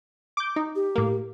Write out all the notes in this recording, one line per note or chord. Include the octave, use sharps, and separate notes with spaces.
D6 G6
D#4
G4
A2 A#3